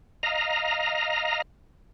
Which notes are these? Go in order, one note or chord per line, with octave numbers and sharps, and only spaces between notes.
D#5 F5 A#5